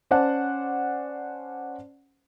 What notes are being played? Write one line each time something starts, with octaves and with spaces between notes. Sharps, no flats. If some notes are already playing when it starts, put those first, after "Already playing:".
C#4 C5 D5 F#5 A5